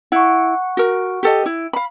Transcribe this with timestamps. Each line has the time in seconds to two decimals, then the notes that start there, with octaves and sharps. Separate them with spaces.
0.12 E4 F#5 C#6
0.77 F#4 A#4
1.23 G4 A4 D#5
1.46 E4
1.73 F5 B5